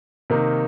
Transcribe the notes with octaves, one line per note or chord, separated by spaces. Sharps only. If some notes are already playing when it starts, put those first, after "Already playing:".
C3 D#3 A#3 D#4